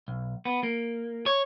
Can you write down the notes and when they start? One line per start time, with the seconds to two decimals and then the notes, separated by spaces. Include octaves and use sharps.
0.08 B1
0.45 B3
0.63 A#3
1.26 C#5